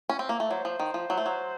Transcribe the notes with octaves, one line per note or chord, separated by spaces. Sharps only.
C#4
C4
A#3
A3
F#3 C5
F3
D#3
F3
F#3
A3
F#3